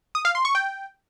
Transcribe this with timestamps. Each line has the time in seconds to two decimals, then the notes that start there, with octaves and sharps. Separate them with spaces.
0.15 D#6
0.25 F5
0.35 C6
0.45 C#6
0.55 G5